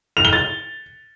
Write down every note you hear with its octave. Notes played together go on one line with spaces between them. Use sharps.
F7
G7
A6